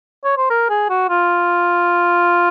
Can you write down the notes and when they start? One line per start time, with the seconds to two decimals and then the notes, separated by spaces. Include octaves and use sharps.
0.24 C#5
0.37 C5
0.50 A#4
0.70 G#4
0.89 F#4
1.09 F4